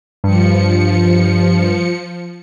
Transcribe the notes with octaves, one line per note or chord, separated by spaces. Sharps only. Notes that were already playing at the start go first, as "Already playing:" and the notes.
G2 F3 C#7